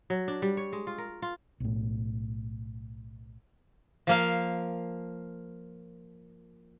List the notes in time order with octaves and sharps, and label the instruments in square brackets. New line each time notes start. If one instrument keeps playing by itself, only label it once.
[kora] F#3
D4
G3
C#5
G#3
F4
A#4
F4
[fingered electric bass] B1 A2
[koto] F3 A#3 F5